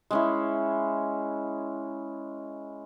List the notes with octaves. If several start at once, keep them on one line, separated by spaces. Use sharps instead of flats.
G#3 C#4 E4